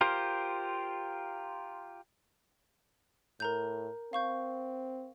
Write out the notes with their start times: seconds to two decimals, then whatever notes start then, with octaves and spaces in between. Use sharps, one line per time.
0.01 F4 G4 A#4 C5
3.40 A2 A#4 A#5 G6
4.13 C4 F5 C#6 G6